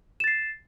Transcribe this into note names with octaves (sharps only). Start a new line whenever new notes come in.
A6 C7 E7